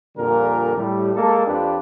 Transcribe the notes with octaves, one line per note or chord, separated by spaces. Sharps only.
F2 A#2 D3 G3 A#4
A2 G3
G#3 A#3 A4
F2 D4 F4 G4 B4